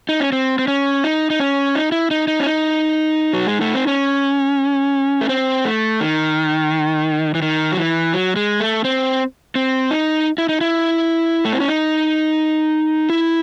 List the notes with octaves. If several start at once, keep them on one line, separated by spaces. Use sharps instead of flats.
D#4
C#4
C4
C4
C#4
D#4
D#4
C#4
D#4
E4
D#4
D#4
C#4
D#4
F#3
G#3
A3
C4
C#4
A3
C4
A3
D#3
E3
D#3
F#3
E3
F#3
G#3
A3
C4
C4
D#4
E4
D#4
E4
A3
C4
C#4
D#4
E4